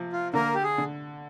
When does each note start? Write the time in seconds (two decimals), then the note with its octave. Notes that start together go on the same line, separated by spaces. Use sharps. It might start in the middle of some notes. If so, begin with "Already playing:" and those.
Already playing: C3 F3
0.13 F4
0.34 D3 A#3 A#4
0.55 G4
0.63 G#4
0.78 D3